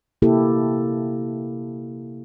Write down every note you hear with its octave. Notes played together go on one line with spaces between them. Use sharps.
C3 A#3 E4 G4 A4